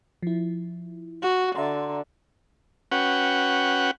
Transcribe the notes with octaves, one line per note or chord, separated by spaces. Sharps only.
F3 E4
F#4
D3 E5 A#5 C6
C#4 F#4 B4 F#5 G5